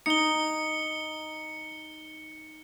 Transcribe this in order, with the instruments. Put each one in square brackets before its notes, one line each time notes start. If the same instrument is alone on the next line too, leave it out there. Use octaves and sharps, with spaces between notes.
[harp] D#4 [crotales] C#7 G7